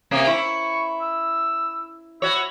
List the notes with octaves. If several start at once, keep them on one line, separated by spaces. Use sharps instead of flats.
C3 A#3 C#4
E4 C#6
E6
E4 F#4 C#5